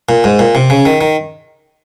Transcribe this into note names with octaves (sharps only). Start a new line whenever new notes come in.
A#2
G#2
A#2
C3
C#3
D#3
D#3